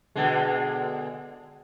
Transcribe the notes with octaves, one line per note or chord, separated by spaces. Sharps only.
B2 D3 G#3